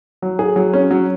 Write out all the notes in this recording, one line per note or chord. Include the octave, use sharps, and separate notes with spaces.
F#3
G#4
F#3
C#4
F#3